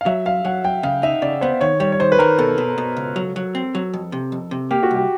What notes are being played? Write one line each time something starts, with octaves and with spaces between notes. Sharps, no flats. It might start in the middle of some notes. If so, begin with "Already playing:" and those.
F5
F#3 E5
F#2 F5
F#3 F#5
F#2 G5
C#3 F5
D#4 E5
C#3 D5
B3 C5
D#3 C#5
G3 C#5
C#5
D#3 C5
B4
D#3 A#4
B2 A4
B2
B2
C#2
F#3
F#3
C4
F#3
F2
C3
F2
C3
A#3 G4
F#4
C2 G4